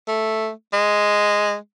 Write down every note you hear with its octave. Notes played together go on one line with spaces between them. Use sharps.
A3
G#3